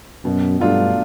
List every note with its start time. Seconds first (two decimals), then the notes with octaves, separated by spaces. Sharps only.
0.25 F#2 B2
0.60 G2 F#3 A3 D4 F4